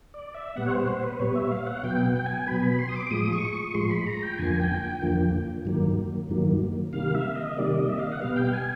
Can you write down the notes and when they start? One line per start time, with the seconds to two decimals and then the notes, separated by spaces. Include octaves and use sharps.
0.14 D5
0.35 E5
0.56 A#2 G3 B3 F#5
0.66 C#5
0.71 C5
0.88 C5
1.03 B4
1.20 A#2 G3 B3 C#5
1.35 E5
1.51 F5
1.67 F#5
1.83 B2 F#3 B3 G5
2.16 G5
2.26 G#5
2.46 B2 F#3 B3 B5
2.63 B5
2.79 C6
2.89 D#6
2.95 D6
3.07 D6
3.11 A2 F3 G#3 D#6
3.32 C#6
3.53 C#6
3.74 A2 F3 G#3 C6
3.90 B5
4.06 A#5
4.23 G5
4.38 F2 D3 F3 A#3 G#5
4.60 G5
4.81 G5
5.02 F2 D3 F3 A#3
5.65 G2 D#3 F#3 A#3
6.29 G2 D#3 F#3 A#3
6.93 C3 D#3 G3 A#3 F5
7.15 E5
7.36 D#5
7.57 C3 D#3 G3 A#3 D5
7.78 D#5
7.89 E5
7.99 F5
8.12 F#5
8.20 B2 G3 B3 F5
8.36 G5
8.53 G#5